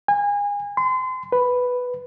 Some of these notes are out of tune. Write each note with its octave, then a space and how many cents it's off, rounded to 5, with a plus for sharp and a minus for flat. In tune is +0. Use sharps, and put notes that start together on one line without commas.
G#5 -30
C6 -35
B4 +5